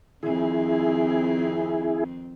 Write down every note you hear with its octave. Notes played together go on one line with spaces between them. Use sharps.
F2 D#3 C4 E4 G#4